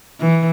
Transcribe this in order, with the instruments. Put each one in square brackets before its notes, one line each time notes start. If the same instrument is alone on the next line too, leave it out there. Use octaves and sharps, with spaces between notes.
[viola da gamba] E3